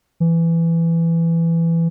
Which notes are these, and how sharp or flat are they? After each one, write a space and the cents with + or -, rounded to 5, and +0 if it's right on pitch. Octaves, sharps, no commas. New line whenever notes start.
E3 +15